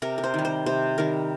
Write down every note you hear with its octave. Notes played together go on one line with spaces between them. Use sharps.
C3 A#4
A#4
C5
D#3 G3
C5
C3 C5
D#3 G3 A#4